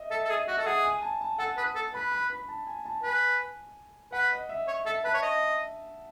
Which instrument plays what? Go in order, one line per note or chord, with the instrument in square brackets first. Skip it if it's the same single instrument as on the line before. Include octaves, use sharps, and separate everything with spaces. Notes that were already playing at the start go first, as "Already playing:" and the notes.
Already playing: [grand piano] D#5 E5
[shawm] A4 [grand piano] E5
[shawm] A4
[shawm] G#4 [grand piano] D#5
[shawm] F#4 [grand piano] E5
[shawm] A4
[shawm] G#4 [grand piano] F#5
[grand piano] G#5
A5
A5
[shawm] A4 [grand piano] F#5
[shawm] B4 [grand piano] D#6
[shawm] A4
[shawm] B4 [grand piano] B5
[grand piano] B5
B5
A5
G#5
A5
[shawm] B4 [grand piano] G#5
[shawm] B4 [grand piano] F#5
[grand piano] D#5
E5
[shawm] C#5
[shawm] A4 [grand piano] E5
[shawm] B4 [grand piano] A5
[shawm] C#5
D#5